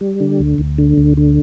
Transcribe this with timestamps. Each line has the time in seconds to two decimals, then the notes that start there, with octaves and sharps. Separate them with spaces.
0.01 G3
0.20 D3
0.39 D2
0.58 D2
0.78 D3
0.98 D2
1.17 D3